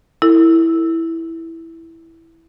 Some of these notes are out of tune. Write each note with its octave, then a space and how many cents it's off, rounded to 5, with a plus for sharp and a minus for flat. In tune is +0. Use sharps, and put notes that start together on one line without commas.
E4 +0 A#4 -45